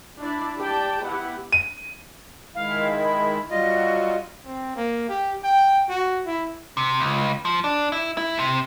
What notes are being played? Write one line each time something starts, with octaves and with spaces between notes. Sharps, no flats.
D4 E4 D5
G4 D5 G5 A5
B3 E4 G4 F#5
D#7
D#3 G#3 E4 F5
B5
F#3 G3 F4 F#4 D#5 A#6
C4
A#3
G4
G5
F#4
E4
C3
C#2
F3
D4
E4
E4
C3